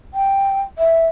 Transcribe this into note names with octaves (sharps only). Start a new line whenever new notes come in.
G5
E5